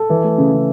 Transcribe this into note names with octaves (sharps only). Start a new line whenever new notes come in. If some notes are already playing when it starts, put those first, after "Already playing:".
Already playing: A4
E3
A3
C#3
C#3